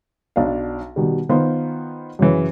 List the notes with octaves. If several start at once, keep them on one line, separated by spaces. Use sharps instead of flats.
B1 D4 F5
B2 D#3 G3
D#3 B3 D#4 F4 C5
F#2 C#3 E3